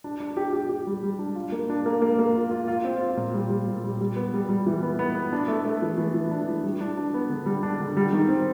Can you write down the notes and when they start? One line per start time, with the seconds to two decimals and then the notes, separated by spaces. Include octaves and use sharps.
0.04 D4
0.20 D4
0.37 G4
0.53 G4
0.69 G4
0.87 G3
1.03 G3
1.19 D4
1.35 F4
1.52 A#3
1.69 D4
1.86 A#3
2.02 A#3
2.19 A#3
2.35 F4
2.51 F4
2.68 F4
2.85 C4
3.00 F4
3.17 A#2
3.34 G3
3.50 G3
3.67 A#2
3.84 G3
4.01 G3
4.16 B3
4.34 G3
4.49 G3
4.67 E3
4.82 B3
4.99 B3
5.15 B3
5.33 D4
5.48 A3
5.65 A3
5.82 E3
5.98 E3
6.14 E3
6.31 D4
6.47 E3
6.64 G3
6.81 D4
6.97 D4
7.14 B3
7.30 D3
7.46 G3
7.63 D4
7.80 D3
7.97 G3
8.13 D#3
8.28 C4